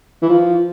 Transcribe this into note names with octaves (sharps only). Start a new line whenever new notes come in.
E3
F3